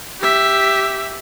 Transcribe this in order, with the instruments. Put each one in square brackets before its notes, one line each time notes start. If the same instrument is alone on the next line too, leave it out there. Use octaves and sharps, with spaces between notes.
[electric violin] G4 E5